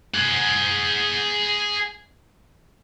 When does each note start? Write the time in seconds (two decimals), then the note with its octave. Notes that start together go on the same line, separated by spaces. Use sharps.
0.14 G#4 F#5